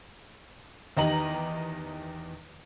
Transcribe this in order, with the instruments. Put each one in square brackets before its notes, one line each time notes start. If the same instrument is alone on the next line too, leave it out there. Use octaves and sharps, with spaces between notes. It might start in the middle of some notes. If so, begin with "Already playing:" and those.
[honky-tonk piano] E2 D#3 G4 D#5 A#5 F#7